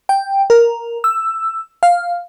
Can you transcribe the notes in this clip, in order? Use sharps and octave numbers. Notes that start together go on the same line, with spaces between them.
G5
A#4
E6
F5